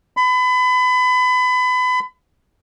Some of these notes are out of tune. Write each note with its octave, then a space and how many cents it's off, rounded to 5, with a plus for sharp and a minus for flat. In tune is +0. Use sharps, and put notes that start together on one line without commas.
B5 +30